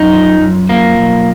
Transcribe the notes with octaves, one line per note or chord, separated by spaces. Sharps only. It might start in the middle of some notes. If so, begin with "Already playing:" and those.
Already playing: F#2 D#4
F3
F#2
F3 A#3
B1